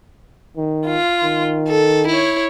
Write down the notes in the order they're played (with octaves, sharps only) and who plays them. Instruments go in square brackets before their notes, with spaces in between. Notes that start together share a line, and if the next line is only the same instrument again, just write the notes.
[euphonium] D#3
[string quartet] F4
[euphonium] D#3
[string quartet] A4
E4 C#5